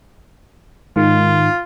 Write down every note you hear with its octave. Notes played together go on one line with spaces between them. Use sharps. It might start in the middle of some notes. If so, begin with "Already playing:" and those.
G#2 D#3 F4